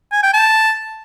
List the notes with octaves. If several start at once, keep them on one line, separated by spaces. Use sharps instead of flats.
G#5
G5
A5